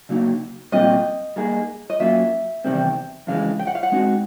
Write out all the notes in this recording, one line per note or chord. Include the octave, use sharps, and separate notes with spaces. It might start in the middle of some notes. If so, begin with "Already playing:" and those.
C#3 F#3 A#3 D#4
A#2 G3 C4 F4 D#5
G3 A#3 D#4 G#4
D#5
F#3 A#3 C#4 F4 E5
E2 C3 D#3 G3 C4
F2 C#3 E3 G#3 F5
G5
F#5
F5
F#5
G#3 C4 D#4 F#4